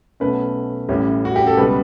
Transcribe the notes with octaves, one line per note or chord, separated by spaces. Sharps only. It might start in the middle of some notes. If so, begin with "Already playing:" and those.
B1 B2 A3 C#4 B4
A1 A2 G3 C#4
F#4
G4
A4
C#2 B2 G3 B4